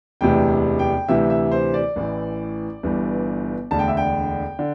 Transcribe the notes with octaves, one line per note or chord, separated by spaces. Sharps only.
E1 D2 C3 E3 G5
G5
D2 C3 E3 E5
E5
C5
D5
A1 A2 E3
G1 G2 E3
E1 D2 D3 A5
G5
E5
G5
D3